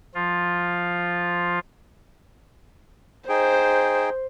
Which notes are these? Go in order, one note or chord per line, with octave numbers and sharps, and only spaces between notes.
F3 F4
D#4 G#4 C5 G5